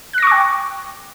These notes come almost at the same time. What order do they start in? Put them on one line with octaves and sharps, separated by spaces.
F#6 A#6 C#6 D6 G5